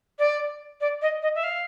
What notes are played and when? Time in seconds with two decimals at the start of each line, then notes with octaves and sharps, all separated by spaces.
0.19 D5
0.80 D5
1.01 D#5
1.22 D#5
1.35 E5
1.43 F5